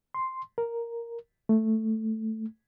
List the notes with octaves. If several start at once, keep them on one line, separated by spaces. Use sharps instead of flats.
C6
A#4
A3